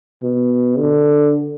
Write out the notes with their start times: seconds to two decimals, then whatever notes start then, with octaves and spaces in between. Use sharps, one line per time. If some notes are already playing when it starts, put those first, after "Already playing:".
0.23 B2
0.78 D3